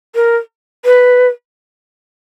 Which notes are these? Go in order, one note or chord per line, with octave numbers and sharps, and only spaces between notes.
A#4
B4